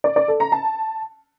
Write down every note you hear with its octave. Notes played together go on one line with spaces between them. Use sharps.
D5
D5
A4
A#5
A5